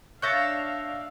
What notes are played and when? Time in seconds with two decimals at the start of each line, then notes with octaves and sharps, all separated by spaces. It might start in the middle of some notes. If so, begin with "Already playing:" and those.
0.22 D4 C#5 E5 F5 A5 F#6 G6 A#6